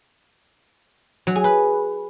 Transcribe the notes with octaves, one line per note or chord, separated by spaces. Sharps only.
F#3
G#4
B4